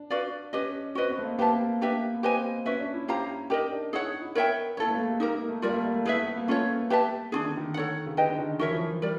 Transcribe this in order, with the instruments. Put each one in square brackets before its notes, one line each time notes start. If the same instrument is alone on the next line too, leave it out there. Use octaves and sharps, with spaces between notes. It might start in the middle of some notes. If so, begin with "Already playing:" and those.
Already playing: [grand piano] D4
[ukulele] F#4 B4 D5 F5
[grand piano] C#4 [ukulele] G4 B4 D#5
[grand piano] C4 [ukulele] F#4 B4 D#5
[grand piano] B3
A3
A#3
[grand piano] A#3 [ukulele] G4 B4 E5 A5
[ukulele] D4 G4 B4 E5
[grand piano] B3
[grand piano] C4 [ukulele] G4 B4 D#5 G#5
[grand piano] C#4 [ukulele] F#4 B4 E5
[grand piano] D4
E4
[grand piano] E4 [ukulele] G4 C5 F5 A#5
[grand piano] D#4 [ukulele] G4 A#4 D#5
[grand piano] D4
[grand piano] D#4 [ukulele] E4 G#4 C#5 F#5
[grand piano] E4
[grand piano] B3 [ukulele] A#4 C#5 E5 G5
[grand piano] A#3 [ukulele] E4 A4 C#5
[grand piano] A3
A#3
A3
G#3
[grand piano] A#3 [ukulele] D#4 G4 A#4
[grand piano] A#3
A3
[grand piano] G3 [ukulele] F4 A#4 D5
[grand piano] A#3
A3
A#3
A3
[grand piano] A3 [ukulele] E4 G#4 B4 E5
[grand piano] B3
B3
A#3
[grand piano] A3 [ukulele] C#4 F4 A4 C#5
[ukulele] G4 B4 E5 A5
[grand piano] D#3 [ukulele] D4 F4 G#4
[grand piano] D3
D#3
[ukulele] A4 C#5 F#5
[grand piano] C#3
[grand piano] D3 [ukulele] G4 B4 D#5 G5
[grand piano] D3
D#3
[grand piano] E3 [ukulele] F#4 A#4 C#5 E5
[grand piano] F3
F3
[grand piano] G3 [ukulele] A#4 D5